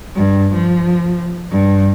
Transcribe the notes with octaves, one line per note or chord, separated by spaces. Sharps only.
G2
F3
G2